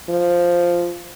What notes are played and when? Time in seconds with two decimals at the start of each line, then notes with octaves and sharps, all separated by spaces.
0.09 F3